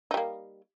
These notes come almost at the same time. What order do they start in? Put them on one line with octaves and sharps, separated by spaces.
D#4 G3 A#3